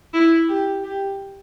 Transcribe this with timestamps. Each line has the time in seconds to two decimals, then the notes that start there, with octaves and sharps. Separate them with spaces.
0.14 E4
0.49 G4
0.83 G4